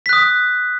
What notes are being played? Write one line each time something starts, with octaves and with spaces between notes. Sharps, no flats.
D#6 F#6 B6